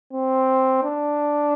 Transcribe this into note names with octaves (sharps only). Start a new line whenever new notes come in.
C4
D4